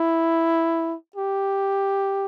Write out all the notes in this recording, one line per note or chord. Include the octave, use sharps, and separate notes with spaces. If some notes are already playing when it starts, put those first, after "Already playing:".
Already playing: E4
G4